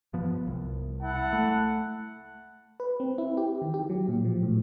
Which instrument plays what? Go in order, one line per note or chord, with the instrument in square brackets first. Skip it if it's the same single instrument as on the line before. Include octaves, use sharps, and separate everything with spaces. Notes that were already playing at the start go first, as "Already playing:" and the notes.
[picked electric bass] G2 F3 B3
C2
[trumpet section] E4 F#5 A5
[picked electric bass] A3
[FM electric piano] B4
C4
E4
G4
D#3
G4
F#3
A#2
F3
A2